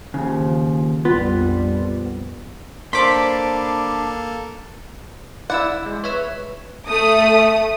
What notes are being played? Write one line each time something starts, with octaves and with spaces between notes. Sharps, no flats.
D#2 C#3 F3
A#1 F2 G3 B3 F4
A#3 D4 A4 C5 B5 C6 D6
E4 D5 F#5 E6
G#3
B4 C#5 E5 E6
A3 D#6